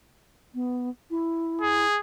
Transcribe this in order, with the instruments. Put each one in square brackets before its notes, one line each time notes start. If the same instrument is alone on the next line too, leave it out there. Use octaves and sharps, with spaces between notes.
[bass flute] B3
E4
[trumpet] G#4